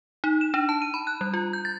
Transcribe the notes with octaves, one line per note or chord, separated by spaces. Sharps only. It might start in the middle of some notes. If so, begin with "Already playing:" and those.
D#4
E7
D4
A5
D#7
B5
F#6
G3
F4
G6
A6